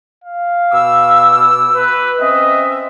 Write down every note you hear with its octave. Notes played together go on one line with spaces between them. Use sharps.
F5
B2 D6 E6
B4
C4 C#4 D#5 E5